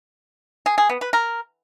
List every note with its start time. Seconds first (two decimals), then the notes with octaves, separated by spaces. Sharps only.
0.66 G#4
0.78 G#4
0.89 B3
1.01 B4
1.13 A#4